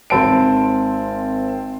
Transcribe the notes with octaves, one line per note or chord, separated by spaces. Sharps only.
G#1 C4 A5 D7